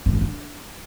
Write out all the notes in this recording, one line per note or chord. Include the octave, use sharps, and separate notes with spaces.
G#3
C#4
D4